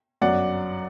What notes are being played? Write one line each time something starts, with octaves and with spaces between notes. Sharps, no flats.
G1 F#2 F#3 D5 F#5